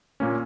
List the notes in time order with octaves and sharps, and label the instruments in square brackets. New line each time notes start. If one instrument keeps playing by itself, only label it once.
[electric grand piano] A#2 A#3 C#4